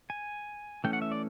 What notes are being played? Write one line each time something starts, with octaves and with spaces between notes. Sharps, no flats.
G#5
E3 A3 C#4 G5
F#5
E5
D5